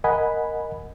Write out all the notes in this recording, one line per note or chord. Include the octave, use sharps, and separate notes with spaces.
A#4 D#5 F#5 G#5 B5